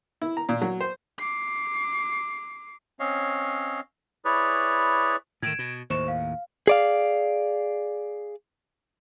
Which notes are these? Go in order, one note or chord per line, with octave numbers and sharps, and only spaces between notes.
E4
A#5
A#2
F#3
C5
D6 C7
C4 C#4 C#5 D#5 F5
E4 G#4 B4 C#5 D5
A2 D#3 G#6 D7 E7
B2
D#2 A2 C5 C#6 E7
F5
G#4 D5 F5